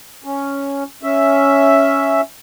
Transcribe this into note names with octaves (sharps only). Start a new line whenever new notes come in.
C#4
C#4 E5